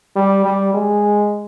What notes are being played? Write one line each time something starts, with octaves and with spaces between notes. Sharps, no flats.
G3
G3
G#3